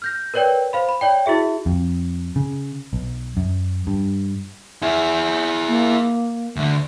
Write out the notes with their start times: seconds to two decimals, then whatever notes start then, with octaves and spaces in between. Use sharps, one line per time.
0.02 F6 G6 A#6
0.34 A#4 B4 C#5 D5 G5
0.73 C5 F5 B5
0.89 B5
1.01 C#5 D5 G5
1.26 E4 F#4 G#4 E5
1.66 F2
2.36 C#3
2.93 B1
3.37 F#2
3.87 G2
4.82 E4 G#4
5.68 A#3
6.57 D2 D3